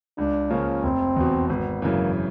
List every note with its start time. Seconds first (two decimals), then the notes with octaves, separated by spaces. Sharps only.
0.18 C#2 D4
0.50 C#3 F3 A#3 C#4
0.83 F1 C4
1.16 E2 B2
1.49 G#1 B3
1.82 F#2 C#3 E3 A#3